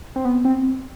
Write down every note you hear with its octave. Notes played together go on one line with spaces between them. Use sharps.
C4
B3
C4